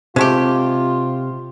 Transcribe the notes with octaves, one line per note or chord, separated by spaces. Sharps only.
C3 G#3 A3 F4 G4